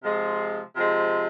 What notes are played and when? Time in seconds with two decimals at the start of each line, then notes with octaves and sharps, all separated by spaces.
0.02 C3 F3 G#3
0.75 C3 F3 G#3